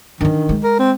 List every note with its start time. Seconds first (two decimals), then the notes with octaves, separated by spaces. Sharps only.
0.21 D#3 E3 D4
0.49 G#3
0.64 A#4
0.79 C4